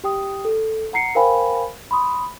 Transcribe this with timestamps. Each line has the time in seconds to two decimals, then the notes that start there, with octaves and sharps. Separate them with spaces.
0.04 G4 G5 D#6
0.45 A4
0.93 F#5 A#5 C7 C#7
1.15 A#4 C5 F5 G5 G#5 B5
1.91 B5 C6 D#6